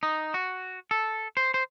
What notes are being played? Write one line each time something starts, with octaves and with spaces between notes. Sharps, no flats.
D#4
F#4
A4
C5
C5